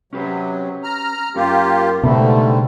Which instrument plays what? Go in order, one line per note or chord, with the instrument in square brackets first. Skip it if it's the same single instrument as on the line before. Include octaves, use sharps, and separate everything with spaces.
[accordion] C3 F#3 [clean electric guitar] C#4 G4 B4
[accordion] A#5 F6
[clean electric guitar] F#2 C#4 [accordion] A#3 F4 G4 [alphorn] A#4
[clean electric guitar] C#2 B5 [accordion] G#2 D3 G3 [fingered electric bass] B2 [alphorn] A3